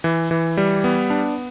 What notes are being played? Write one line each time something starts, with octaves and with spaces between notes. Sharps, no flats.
E3
E3
G3
B3
D4